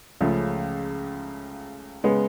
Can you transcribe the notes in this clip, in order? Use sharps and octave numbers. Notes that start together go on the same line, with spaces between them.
C#2 C#3 F3 A3
C#3 G#3 B3